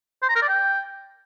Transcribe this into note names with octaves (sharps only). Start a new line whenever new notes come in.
C5
A#5
A#4
D5
G5